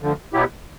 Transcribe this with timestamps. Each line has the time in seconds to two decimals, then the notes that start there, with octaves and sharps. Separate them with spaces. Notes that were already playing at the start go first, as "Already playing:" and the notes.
0.02 D2 D3 F3
0.33 B2 F#3 B3 E4 G4